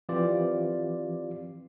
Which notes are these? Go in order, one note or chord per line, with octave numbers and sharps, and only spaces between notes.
E3 F3 C4 F4 G4 D5